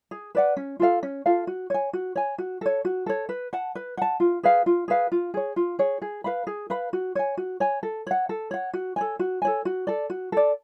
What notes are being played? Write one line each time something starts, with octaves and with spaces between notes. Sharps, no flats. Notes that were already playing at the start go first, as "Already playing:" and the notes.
G#4
B4 D5 F#5
C#4
F4 A4 F5
C#4
F4 A4 F5
F#4
C#5 G#5
F#4
C#5 G#5
F#4
A4 C#5
F#4
A4 C#5
B4
F#5 A5
B4
F#5 A5
F4
G#4 B4 F5
F4
G#4 B4 F5
F4
G#4 C#5
F4
G#4 C#5
G#4
B4 F5 B5
G#4
B4 F5 B5
F#4
C#5 G#5
F#4
C#5 G#5
A4
C#5 F#5
A4
C#5 F#5
F#4
A4 C#5 G#5
F#4
A4 C#5 G#5
F#4
A4 D5
F#4
A4 D5